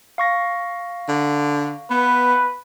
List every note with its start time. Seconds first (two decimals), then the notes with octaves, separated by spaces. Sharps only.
0.18 F5 C#6 A#6
1.09 D3
1.91 B3 B4